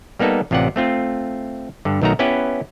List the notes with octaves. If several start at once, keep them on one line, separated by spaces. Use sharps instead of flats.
G3 A#3 B3 D#4 A4
A1 C3 F4 D5 F#5
A3 C4 F4
G2 D3
B1 D#3 A3 F#4 A#5
B3 C#4 E4 G4 B4